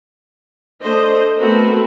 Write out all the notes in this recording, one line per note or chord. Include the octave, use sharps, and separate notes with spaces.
A3 D4 C5 D#5
A3 B3 C4 F#4 A#4 B4